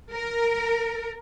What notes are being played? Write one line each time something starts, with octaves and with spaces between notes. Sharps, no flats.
A#4